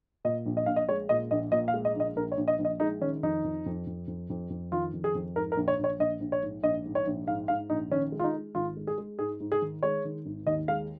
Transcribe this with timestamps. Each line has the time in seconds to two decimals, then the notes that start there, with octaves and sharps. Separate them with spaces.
0.25 A#2 D#5
0.46 A#1
0.57 D#5
0.66 A#1 F5
0.76 D#5
0.89 G#3 C#5
1.09 A#2 D#5
1.31 A#1 D#5
1.52 A#2 D#5
1.68 F5
1.74 G#3
1.85 D#5
1.95 A#1 D#5
2.16 A#1 A#4
2.32 C#5
2.37 A#1
2.48 D#5
2.59 A#1
2.65 D#5
2.80 G#3 D#4
3.01 D#3 C#4
3.23 F2 D#4
3.44 F2
3.66 F2
3.87 F2
4.08 F2
4.30 F2
4.50 F2
4.72 D#3 F4
4.93 F2
5.04 G#4
5.15 F2
5.36 G#2 A#4
5.52 A#4
5.56 A#1
5.68 C#5
5.79 A#1 C#5
5.99 A#1 D#5
6.20 A#1
6.32 C#5
6.43 G#2
6.63 A#1 D#5
6.85 G#2
6.95 C#5
7.07 A#1
7.27 G#2 F5
7.48 G#2 F5
7.70 A#1 D#4
7.91 D#3 C#4
8.12 G#3
8.19 F4
8.24 D#4
8.34 G#3
8.55 G#1 F4
8.77 G#3
8.87 G#4
8.98 G#3
9.19 G#2 G#4
9.40 G#2
9.52 G#4
9.62 D#3
9.83 G#3 C#5
10.05 D#3
10.26 G#1
10.47 D#2 D#5
10.68 G#3 F5